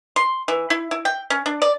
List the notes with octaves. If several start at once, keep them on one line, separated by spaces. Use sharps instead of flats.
C6
E3
E4
E4
G5
C#4
D4
D5